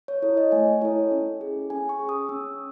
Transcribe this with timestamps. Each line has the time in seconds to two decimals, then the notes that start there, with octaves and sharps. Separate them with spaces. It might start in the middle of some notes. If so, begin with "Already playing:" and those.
0.08 C#5
0.22 E4 A4 C#5
0.37 D#5
0.52 A3 G#5
0.81 E4 A4 C#5
1.11 C#4
1.41 G#4
1.70 C#4 G#5
1.89 C#6
1.99 G#4
2.09 D#6
2.29 C#4 E6